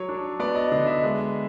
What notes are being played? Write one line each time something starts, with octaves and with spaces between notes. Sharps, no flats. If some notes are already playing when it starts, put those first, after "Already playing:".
Already playing: F#3 C#5
D4
B3 D5
D#5
D3 D#5
E5
G#3